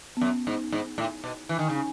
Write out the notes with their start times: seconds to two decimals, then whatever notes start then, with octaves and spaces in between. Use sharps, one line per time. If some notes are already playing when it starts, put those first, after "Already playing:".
0.17 B3
0.21 F#2 C#4
0.47 G#2
0.72 G#2
0.98 A2
1.24 B2
1.49 E3
1.59 D#3
1.69 C#3
1.75 C#4